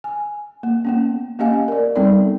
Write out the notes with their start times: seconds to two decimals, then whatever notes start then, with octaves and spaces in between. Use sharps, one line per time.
0.04 G#5
0.63 A#3
0.85 A#3 B3 C#4
1.39 A#3 C#4 G4 D#5 F5 G#5
1.68 A#4 D5
1.96 G3 B3 C4 D#4 A4 D5